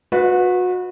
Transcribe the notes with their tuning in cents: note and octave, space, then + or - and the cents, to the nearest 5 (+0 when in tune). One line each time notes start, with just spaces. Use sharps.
F#4 -30 B4 +0 D#5 +0